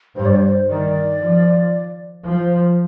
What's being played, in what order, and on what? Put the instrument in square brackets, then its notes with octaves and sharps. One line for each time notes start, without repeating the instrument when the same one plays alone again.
[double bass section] G2 [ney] C5
[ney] D5
C5
[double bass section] D#3 [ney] D5
[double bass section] F3
[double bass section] F3 [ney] C5